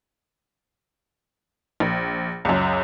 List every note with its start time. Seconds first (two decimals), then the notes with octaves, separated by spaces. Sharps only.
1.80 A#1
2.45 C#2 F#2